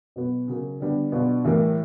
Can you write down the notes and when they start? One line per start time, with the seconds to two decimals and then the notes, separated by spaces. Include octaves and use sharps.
0.16 B2 F#3 B3
0.48 C#3 F#3 A#3
0.80 D3 G3 B3 D4
1.12 B2 F#3 B3 D4 F4
1.45 A2 E3 G3 A#3